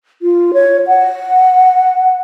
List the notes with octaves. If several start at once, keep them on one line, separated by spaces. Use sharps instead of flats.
F4
C#5
F#5